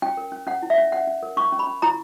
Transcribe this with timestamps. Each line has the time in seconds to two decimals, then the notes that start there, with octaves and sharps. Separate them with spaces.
0.02 C#4 G5
0.17 A#4
0.32 C#4
0.47 C#4 F#5
0.62 E4
0.70 E5
0.78 C#4
0.92 C#4 F#5
1.07 C#4
1.23 A#4
1.37 C#4 C#6
1.52 C#4
1.59 B5
1.67 C#4
1.82 E4 A#5